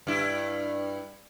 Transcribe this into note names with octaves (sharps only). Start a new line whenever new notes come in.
G2 E4